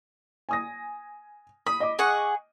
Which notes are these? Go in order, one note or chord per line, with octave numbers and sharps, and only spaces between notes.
G#5 D#6 A#6
B5 D#6
D#5 D6
G#4 F#5 C#6